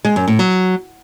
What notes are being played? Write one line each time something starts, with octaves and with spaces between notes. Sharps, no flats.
G#3
F#2
A2
F#3